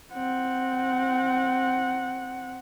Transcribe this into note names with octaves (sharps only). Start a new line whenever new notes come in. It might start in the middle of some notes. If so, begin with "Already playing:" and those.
C4 F#5